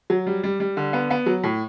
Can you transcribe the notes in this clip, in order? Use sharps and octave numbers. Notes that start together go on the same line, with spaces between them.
F#3
G3
G3
G3
D3
B3
B3
F#3
A2